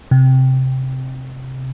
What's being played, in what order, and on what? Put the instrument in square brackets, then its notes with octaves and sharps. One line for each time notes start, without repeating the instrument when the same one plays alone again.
[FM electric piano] C3